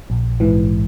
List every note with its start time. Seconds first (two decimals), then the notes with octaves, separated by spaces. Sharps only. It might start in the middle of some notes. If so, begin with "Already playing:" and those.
0.10 A#1
0.40 G#2 E3